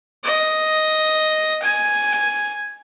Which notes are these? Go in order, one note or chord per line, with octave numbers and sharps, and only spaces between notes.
D#5
G#5